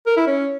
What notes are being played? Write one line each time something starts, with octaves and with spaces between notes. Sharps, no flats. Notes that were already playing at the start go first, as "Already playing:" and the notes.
A#4
E4
C#4